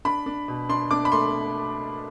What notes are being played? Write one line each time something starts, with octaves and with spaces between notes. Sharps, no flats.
D4 B5
D4
B2
D4 C6
D4 D6
B5
A3 C6